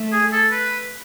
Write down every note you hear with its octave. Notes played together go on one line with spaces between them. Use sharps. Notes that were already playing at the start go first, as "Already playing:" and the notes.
Already playing: A3
G#4
A4
B4